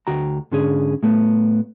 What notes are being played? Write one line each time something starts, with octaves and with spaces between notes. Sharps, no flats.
D2 F#4 G5 A#5
G#2 D3 C#4 G#4
A2 A3 B3